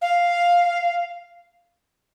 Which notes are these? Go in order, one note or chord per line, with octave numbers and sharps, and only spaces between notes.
F5